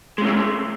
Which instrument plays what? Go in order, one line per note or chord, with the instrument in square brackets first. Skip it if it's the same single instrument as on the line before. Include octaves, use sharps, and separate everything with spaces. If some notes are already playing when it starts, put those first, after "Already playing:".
[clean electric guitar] G#3
C3
A3